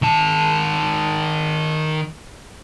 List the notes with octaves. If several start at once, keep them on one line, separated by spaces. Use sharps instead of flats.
D#3 A5